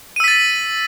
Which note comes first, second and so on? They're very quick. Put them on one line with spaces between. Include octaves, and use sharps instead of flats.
D#7 E6 B6 A6